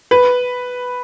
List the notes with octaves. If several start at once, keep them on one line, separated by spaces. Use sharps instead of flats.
B4